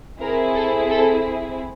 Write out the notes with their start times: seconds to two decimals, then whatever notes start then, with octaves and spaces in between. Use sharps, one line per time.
0.20 C4 E4 G#4 A#4
0.55 A4
0.90 A4